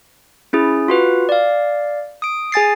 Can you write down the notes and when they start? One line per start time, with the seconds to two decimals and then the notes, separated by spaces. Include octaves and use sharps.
0.53 C#4 E4 G#4
0.88 F4 F#4 B4
1.29 D5 F5
2.22 D#6 D7
2.52 G#4 G#5 A6 C7